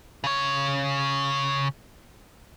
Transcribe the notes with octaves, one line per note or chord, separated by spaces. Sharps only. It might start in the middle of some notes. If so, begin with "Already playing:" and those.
C#3 C#5